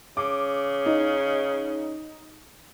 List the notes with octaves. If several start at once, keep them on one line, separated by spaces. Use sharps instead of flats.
C#3 D6
D#4